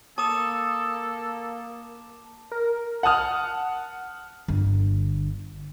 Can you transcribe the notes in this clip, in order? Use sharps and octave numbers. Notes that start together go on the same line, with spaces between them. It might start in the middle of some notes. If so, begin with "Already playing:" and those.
A#3 A4 A5 D6 D#6 E7
A#4
F#5 A5 D#6 F6
G1 D3